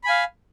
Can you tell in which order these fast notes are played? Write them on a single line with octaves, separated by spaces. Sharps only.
B5 G#5 F5